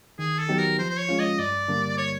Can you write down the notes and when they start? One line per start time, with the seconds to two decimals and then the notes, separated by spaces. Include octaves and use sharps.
0.19 D#3 G#4
0.39 A4
0.49 F#3 B3 D#4 G4
0.59 A#4
0.78 F3 C5
0.90 C5
0.98 C#5
1.09 G#3 C#4 F4
1.19 D#5
1.39 G2 D5
1.68 D3 G3 A#3 D4
1.98 C#5